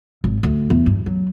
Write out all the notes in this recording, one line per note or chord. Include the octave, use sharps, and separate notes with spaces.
G#1
D2
E2
G2
F#3